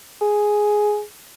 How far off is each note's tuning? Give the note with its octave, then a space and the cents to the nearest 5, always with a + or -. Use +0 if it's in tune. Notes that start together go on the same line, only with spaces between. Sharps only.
G#4 +5